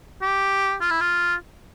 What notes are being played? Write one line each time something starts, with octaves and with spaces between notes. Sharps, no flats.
G4
F4
E4
F4